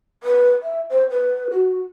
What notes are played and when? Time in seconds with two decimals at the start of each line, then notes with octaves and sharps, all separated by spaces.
0.23 B4
0.63 E5
0.90 C5
1.10 B4
1.51 F#4